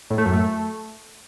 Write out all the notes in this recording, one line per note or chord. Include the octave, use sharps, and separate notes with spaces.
A2
A3
F#2
A3